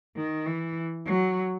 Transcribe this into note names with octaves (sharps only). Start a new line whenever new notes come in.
D#3
E3
F#3